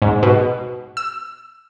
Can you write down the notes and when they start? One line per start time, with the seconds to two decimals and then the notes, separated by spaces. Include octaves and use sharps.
0.02 G#2
0.23 B2
0.97 E6